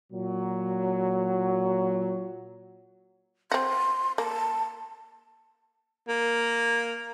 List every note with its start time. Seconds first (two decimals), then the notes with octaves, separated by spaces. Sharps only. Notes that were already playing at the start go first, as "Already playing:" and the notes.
0.12 A#2 F#3
3.52 C4 F#4 C6
4.18 A#3 A5
6.08 A#3